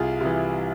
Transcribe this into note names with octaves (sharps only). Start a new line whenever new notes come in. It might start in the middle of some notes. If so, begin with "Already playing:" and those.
Already playing: C2 F4 G#4
C3 E3